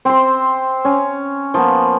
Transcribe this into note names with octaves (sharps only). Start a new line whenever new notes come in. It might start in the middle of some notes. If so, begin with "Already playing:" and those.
C4 C5
C#4
F3 A#3 B3